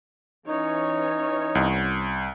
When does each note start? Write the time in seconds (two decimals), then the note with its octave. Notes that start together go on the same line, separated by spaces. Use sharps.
0.47 E3 C#4 D#4 C#5
1.55 C2